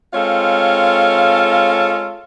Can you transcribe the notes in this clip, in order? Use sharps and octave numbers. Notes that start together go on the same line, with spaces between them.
G#3 C4 F4 A4 C#5 F5